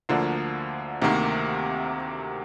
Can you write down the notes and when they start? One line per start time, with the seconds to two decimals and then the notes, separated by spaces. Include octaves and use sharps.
0.09 D2 D3 F3 A#3
1.02 D2 C3 D#3 A#3